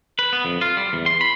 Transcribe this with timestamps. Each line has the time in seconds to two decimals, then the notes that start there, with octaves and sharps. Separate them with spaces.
0.19 B4
0.33 B3
0.45 F2
0.61 F4
0.77 G3
0.93 E2
1.06 C6
1.21 B5